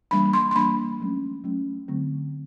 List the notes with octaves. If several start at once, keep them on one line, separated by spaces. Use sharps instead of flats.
E3 G3 A#3 D4 B5
C6
C6
E3 G3 A#3 D4 B5
F#3 A3 C#4
F#3 A3 C#4
D3 F#3 A3 C4